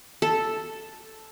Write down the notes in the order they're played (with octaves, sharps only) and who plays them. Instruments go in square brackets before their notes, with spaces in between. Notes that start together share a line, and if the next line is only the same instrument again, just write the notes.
[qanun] A4